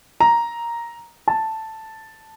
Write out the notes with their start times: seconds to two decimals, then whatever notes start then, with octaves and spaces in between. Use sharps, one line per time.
0.20 A#5
1.28 A5